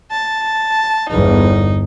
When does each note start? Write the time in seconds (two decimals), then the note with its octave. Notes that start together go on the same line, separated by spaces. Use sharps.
0.11 A5
1.10 G1 E2 D#4